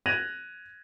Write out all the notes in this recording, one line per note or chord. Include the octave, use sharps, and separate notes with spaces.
F#6 G#6 A#6 D#7 F7 F#7